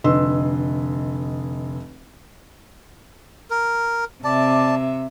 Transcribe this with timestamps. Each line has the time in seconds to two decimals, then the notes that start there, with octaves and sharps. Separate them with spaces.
0.04 F1 D3 B4 D#5 C6 E6
3.50 A#4
4.24 C3 D5 E5 A5